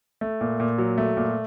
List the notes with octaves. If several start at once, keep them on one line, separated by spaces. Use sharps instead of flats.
A3
A#2
A#2
F#3
A3
A#2